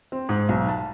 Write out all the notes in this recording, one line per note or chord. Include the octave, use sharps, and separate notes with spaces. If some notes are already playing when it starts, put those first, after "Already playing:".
C4
G#2
B1
A5